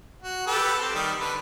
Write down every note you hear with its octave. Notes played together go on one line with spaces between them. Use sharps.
F#4
G4 A4 B4
C4
D#3 G3
D3 B4